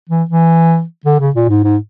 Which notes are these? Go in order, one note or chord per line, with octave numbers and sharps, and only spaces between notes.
E3
E3
D3
C#3
A#2
G#2
G#2